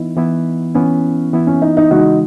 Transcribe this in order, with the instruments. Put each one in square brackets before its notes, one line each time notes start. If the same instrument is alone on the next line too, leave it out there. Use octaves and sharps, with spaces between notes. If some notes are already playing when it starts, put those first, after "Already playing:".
Already playing: [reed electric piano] E3 B3 E4 [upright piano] D#4
[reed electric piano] E3 B3 E4
[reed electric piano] E3 B3 E4 [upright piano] C#4
[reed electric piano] E3 B3 E4
[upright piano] C#4
D#4
D#4
[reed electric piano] C#3 E3 G#3 [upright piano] D#4 F#4